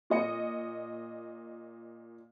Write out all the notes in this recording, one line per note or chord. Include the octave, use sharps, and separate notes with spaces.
A#2 D#5 C#7